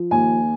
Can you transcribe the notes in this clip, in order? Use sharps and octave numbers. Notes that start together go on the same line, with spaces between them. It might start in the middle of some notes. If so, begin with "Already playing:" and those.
Already playing: F3
D#2 G#5